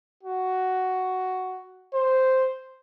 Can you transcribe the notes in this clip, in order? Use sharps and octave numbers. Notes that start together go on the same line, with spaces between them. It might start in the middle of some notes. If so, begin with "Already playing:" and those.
F#4
C5